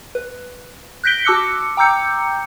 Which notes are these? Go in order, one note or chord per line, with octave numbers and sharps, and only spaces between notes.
B4
F#6 G6 A#6 B6 D7 G7
F#4 A5 D6 E6 F#6 C#7
G5 A#5 D6 E6 G6 C#7